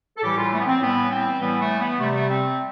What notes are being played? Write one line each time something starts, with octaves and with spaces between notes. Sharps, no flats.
A4
A2 E3 G3 G4
F4
A3
B3
C4
A2 E3 G3 B3
C4
A2 E3 G3 B3
A3
B3
C3 G3 A3
A3
C4